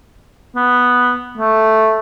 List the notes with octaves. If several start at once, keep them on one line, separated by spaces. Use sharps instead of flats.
B3
A3